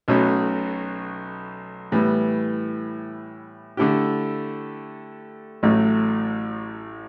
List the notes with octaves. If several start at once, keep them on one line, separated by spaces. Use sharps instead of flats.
B1 B2 A3 C#4 F#4
A2 E3 G3 B3
D3 A3 E4 G4
A1 A2 F#3 A3